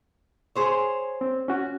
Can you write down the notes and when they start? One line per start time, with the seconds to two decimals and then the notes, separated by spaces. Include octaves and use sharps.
0.55 G#4 C5 C#5
1.21 C4
1.48 C#4 F#4